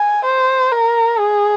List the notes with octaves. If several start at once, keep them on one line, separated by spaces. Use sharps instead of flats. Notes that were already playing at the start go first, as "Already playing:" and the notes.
Already playing: G#5
C5
A#4
G#4